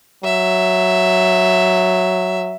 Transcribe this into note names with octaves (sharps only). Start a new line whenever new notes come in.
F#3 E5